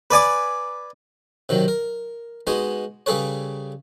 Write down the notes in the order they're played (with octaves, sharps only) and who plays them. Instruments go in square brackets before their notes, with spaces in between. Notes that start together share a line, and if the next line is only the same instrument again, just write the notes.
[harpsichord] B4 D5 G#5 D6
C3 D#3 F#3
A#4
G#3 B3 D#4 F#4 G#5
C#3 G3 G#4 A4 B4 C#5